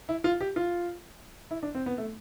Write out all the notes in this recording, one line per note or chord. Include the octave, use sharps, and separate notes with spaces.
E4
F4
G4
F4
E4
D4
C4
B3
A3